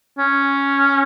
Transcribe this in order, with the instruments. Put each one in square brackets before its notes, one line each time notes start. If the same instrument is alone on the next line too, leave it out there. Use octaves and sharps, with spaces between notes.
[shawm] C#4